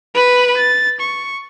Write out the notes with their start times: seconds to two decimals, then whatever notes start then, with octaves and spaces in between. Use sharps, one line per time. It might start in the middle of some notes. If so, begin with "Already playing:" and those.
0.15 B4 B5
0.57 A6
1.00 C#6